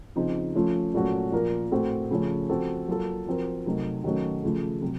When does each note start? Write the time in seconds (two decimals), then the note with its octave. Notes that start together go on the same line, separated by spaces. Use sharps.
0.16 C#3 F3 C4 D#4
0.55 F3 A3 C#4 F4
0.94 A#2 F#3 A3 C#4 F#4
1.32 A#2 F3 A#3 F4 A#4
1.71 A2 A3 C4 F#4 A4
2.10 C#3 F3 A3 C#4
2.49 F3 C4 F#4 A4
2.88 F#3 A#3 F4 A4
3.27 F3 C4 F#4 A#4
3.66 C3 F#3 A3 D#4 A#4
4.04 D#3 F#3 A3 C#4 F#4
4.43 C#3 F3 A3
4.82 C3 F#3